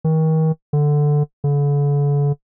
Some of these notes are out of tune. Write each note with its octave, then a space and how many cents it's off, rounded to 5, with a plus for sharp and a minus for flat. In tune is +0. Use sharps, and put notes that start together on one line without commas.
D#3 +35
D3 +5
D3 -40